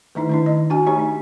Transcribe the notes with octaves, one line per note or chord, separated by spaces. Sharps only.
D#3 A3 D#4 E4
D#3 D4 E4
D#5
D4 F#4 G#5
A3 D#4 G4 C#5 G#5
D#4